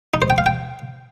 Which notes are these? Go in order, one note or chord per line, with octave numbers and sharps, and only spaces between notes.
D#4
C5
G5
F5
G5